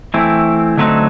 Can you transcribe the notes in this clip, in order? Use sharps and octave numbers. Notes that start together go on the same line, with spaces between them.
E3 A3 C4 E4
D3 F#3 A3 C4 D#4